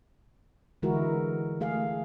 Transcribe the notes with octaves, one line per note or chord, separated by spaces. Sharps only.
D3 E3 G#3 E4 F#4 A#4
A3 G#4 F5